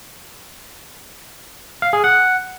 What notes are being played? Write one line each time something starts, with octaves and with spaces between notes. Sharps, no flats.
F5
G#4
F#5